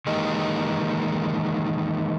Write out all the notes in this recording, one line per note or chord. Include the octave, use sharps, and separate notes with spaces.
D#3 E3 G#3 A#3 D#4 G4